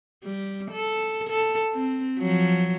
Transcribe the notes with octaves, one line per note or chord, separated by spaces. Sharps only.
G3
A4
A4
C4
F3 F#3